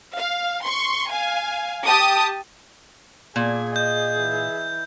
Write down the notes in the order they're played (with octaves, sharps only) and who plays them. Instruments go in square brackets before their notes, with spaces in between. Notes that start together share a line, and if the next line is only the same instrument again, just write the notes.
[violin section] F5
C6 C#6
F5 G#5
G4 A5 D#6
[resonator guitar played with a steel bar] A#2 [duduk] G#4 [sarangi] G#5
[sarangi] D#5 [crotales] G6
[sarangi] E3